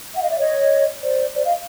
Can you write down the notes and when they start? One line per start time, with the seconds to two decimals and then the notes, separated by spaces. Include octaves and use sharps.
0.14 E5 F#5
0.22 D#5 F5
0.30 D5 E5
0.38 C#5 D#5
1.02 C5 D5
1.34 C5 D5
1.45 D#5 F5